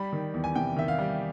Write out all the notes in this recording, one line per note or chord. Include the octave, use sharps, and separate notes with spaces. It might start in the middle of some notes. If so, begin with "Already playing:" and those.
Already playing: G3 B5
D#3
E2
G#5
C3 G5
D#3 E5
F5
G3